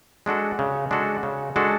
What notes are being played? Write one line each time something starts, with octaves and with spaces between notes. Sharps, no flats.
G#3 D4 F#4 A4
C#3
G#3 D4 F#4 A4
C#3
G#3 D4 F#4 A4